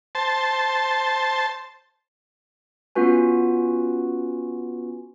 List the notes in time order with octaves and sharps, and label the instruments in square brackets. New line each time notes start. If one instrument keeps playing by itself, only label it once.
[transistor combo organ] C5 A5
[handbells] B3 C#4 F4 F#4 B4 G#5